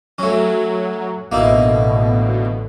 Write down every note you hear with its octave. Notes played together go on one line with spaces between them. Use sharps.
F#3 A3 C#4
A1 B2 D3 A#3 D#4 E4